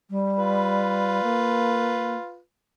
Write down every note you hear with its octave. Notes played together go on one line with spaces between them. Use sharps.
G3
F4 B4
A#3